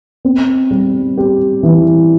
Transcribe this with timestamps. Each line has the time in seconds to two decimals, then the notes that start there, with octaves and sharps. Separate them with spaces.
0.25 C4
0.71 G3
1.17 G4
1.63 E3